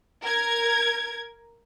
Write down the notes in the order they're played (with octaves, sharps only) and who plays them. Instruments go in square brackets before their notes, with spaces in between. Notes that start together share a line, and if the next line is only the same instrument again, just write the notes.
[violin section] A#4 G#6